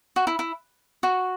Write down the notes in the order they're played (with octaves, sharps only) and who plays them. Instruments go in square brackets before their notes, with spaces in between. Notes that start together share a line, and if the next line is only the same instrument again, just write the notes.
[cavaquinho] F#4
E4
E4
F#4